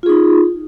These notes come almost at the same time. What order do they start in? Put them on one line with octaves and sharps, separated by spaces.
F4 G#4 D#4